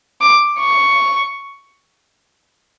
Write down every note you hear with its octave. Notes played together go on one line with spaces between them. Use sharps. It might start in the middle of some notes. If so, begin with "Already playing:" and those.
D6
C#6